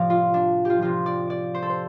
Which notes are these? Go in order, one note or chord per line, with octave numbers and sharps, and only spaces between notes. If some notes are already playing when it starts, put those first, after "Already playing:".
Already playing: A2 C3 F3 D5 F5
F4
D4
F4 G4
C3 F3 F4
D5
D5
C5
A4
C5